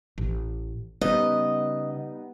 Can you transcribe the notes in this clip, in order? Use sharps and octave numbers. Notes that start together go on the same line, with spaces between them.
A1
C#3 G3 B3 D#4 D#5